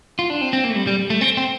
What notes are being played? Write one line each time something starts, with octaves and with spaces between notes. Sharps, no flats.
F4
D4
C4
C4
A#3
A3
G3
G3
A3
C4
C4